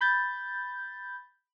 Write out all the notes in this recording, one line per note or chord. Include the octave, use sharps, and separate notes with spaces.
B5 G6 A6